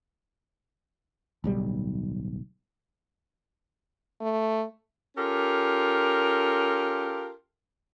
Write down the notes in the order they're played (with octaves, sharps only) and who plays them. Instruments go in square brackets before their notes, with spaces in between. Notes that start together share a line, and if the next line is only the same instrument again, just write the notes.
[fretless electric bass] D1 B1 G3
[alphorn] A3
[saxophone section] C#4 F4 G4 A4 A#4